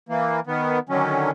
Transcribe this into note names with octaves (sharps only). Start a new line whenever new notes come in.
E3 A#3
D#3 B3
D3 D#3 F#3 C#4